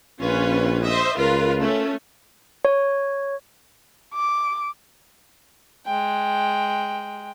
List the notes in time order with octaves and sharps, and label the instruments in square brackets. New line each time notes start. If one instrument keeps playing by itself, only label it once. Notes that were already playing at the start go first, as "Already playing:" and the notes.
[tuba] A#1 [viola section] C#4 F4 B4
[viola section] C5 D#5 E5
[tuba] C#2 [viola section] F4 A#4 B4
[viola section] A3 C#4
[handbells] C#5
[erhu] D6
[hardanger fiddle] G#3 G5